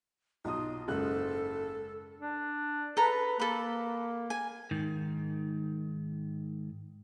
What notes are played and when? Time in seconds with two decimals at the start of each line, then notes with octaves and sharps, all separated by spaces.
0.45 B1 D#4 F4 D#6
0.88 F#1 G#2 A4 F#6
2.19 D4
2.97 A4 B4 A#5
3.40 A#3 A4 B5
4.30 G#5
4.71 G#2 D#3